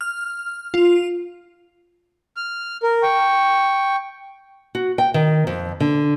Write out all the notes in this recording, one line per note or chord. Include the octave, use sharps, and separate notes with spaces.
F6
F4
F6
A#4
G5 C#6
F#4
G5
D#3
F2
D3